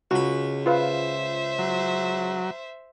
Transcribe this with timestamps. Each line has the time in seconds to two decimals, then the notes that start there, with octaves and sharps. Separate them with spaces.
0.11 C#2 F#4 B5
0.66 F4 B4 C5 E5 F5
1.59 F#3